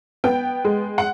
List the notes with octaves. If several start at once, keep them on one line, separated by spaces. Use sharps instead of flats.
B3 G5
G#3
F#5